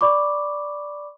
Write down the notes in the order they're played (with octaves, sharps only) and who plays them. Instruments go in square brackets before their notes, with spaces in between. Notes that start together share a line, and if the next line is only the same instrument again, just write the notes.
[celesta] D5 B5 C#6 D6